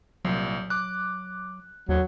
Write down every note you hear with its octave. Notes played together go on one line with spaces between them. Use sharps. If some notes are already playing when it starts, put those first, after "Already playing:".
C2 A#2 F#3
D6 F#6
D#2 F#3